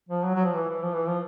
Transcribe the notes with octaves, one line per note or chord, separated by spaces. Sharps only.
F3
F#3
F#3
F3
E3
E3
F3
E3
F3